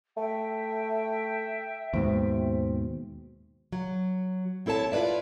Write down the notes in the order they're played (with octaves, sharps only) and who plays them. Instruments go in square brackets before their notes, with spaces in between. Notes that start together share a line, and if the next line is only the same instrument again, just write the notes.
[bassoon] A3 [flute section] E5 G5
[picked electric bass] D#2 G#2 B2 [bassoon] C4
[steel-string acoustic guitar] F#3
C4 E4 A4 C#5 A5
E4 F4 B4 D5 E5